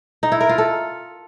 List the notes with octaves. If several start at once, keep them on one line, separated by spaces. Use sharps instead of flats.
D#4
E4
A#4
F4
A4